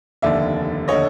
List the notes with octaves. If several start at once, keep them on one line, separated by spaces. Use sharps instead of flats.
F1 D#2 D3 D5 E5
D3 C#5 D#5